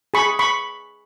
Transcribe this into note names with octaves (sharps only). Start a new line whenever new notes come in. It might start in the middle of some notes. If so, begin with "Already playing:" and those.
G#4 B5 C#6
B5 C#6